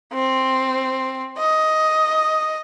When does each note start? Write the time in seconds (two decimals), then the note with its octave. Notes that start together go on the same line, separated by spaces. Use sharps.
0.13 C4
1.38 D#5